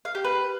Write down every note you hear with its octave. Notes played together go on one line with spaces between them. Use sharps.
F5
G4
B4